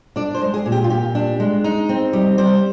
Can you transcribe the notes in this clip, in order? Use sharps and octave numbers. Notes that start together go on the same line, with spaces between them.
D4 D5
C5
G#3
G#4
A#2
G4
F4
A#2 G4
D4
G#3
D#4
C4
G3
G3 C5